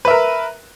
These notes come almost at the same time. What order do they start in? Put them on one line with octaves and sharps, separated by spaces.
B4 E5 A#4